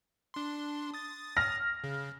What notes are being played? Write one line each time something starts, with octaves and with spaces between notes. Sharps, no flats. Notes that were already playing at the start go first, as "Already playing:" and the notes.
D4 C6
D#6 A6
F6 A#6
C#3